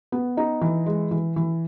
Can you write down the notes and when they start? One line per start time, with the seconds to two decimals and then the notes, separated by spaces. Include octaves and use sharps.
0.12 B3
0.37 D#4
0.61 E3
0.86 G#3
1.11 E3
1.36 E3